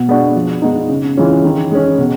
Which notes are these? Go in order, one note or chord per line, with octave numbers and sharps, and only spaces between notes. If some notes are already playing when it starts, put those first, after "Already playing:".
Already playing: B2
G#3 B3 D4 F#4
F3
G#3 B3 D#4
C#3
E3 G#3 C#4 F4
D#3
G#3 C#4
B2